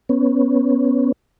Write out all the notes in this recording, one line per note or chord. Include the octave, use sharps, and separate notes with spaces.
B3 C#4